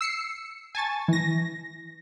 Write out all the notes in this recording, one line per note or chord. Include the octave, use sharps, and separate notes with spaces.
E6 C7 C#7
G#5 A5 C#6 A6
E3 A#6